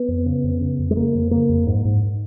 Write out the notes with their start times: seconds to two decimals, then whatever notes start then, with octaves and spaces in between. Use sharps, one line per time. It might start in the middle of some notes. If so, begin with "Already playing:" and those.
Already playing: B3
0.08 F2
0.26 C#3
0.44 F2
0.61 C#3
0.79 F2
0.91 G#3
0.97 C#3 A#3
1.15 F2
1.31 C#3 A#3
1.49 F2
1.67 G#2
1.85 G#2